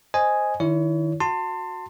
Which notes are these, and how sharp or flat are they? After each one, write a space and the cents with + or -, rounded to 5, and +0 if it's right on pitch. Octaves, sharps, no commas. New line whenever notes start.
C5 +0 D#5 +0 G#5 +0
D#3 -15 E4 +0 C#5 +35
F#4 -15 A5 +30 C6 +0